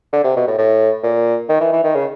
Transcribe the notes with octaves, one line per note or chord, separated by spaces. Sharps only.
D3
C3
B2
A2
A2
A#2
D#3
E3
E3
D#3
C#3